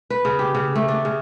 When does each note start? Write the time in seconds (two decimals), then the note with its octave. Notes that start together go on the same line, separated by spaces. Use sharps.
0.10 B4
0.25 C#3
0.39 G4
0.55 C#3
0.76 A3
0.88 D4
1.05 C#3